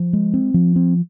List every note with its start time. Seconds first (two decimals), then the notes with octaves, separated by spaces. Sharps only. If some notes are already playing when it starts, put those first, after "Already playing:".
Already playing: F3
0.13 G#3
0.34 C4
0.54 F3
0.76 C4